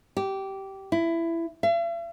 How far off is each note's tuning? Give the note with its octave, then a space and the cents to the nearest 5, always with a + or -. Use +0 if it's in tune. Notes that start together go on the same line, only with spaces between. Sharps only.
G4 -15
E4 +15
E5 +45